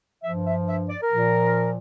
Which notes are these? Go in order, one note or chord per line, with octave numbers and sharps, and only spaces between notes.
F3 E5
G2
E5
E5
D5
A#4
A#2 F3